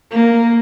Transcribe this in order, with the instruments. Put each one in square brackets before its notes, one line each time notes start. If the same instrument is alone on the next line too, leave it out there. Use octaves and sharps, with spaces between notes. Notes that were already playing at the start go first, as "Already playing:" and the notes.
[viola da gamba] A#3